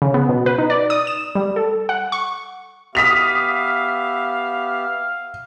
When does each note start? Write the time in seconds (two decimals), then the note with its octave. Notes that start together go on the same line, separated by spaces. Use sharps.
0.02 C#3
0.14 B3
0.29 B2
0.46 B4
0.58 D#4
0.70 D5
0.90 D#6
1.07 E7
1.35 G3
1.56 A4
1.89 F#5
2.12 C#6
2.95 B3 G4 E5 F5 D#6 B6 F7